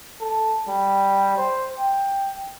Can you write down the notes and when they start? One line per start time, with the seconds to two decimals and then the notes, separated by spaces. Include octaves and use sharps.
0.20 A4
0.68 G3
1.37 C5
1.78 G5